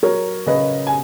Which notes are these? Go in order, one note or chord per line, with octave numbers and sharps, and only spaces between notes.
F#3 A#4 C#5
C#3 B4 D#5
G#5